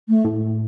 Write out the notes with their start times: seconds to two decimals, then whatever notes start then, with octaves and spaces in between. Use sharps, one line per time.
0.09 A3
0.25 A2